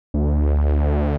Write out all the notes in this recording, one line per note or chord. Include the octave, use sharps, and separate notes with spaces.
D2